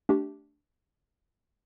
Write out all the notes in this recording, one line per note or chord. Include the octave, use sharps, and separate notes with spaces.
A3 D4 G4